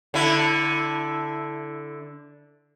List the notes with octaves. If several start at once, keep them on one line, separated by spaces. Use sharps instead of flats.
D3 E4